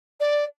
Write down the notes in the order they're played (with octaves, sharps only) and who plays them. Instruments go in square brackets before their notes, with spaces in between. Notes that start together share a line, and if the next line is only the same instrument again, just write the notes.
[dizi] D5